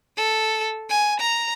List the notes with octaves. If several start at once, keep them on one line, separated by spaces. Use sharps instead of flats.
A4
G#5
A#5